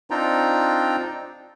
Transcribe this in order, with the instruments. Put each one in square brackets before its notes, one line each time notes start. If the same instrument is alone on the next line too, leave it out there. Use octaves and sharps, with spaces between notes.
[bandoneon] C4 D4 D#4 F4 G5 A#5